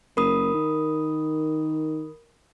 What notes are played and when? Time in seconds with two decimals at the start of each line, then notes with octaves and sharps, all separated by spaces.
0.17 F#1 A#4 B5 D#6
0.54 D#3